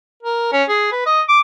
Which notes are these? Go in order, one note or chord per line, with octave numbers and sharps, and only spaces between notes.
A#4
C#4
G#4
B4
D#5
D6